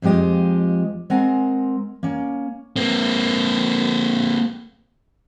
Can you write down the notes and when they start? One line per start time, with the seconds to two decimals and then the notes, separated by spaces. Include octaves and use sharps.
0.02 F2 F3 G#3 G4 D#5
1.10 G#3 C4 A#4 F#5 G#5
2.03 A#3 C#4
2.76 A#3 C4